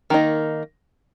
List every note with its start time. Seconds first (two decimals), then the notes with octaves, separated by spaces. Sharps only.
0.10 D#3 A#3 D#4